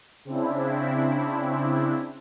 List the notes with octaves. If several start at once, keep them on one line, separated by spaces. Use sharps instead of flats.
C#3 C4 D4 E4